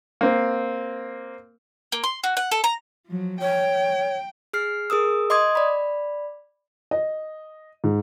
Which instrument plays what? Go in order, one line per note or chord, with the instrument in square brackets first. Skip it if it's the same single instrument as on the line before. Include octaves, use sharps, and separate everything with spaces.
[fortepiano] A#3 C4
[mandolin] A#3
C6
F#4
F#5
A4
A#5
[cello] F3 F#3
[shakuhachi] C#5 [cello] G5
[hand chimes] G#4 F6 C7
G#4 A#4 D#6 E6
D#5 C6 D6 D#6 G#6
D5 B5
[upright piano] D#5
G#2